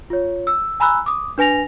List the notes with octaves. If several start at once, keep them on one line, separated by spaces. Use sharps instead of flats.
F4 C#5
E6
G#5 A#5 B5 E6 F#6
D6 D#6
D4 B4 G#5 A#6 F7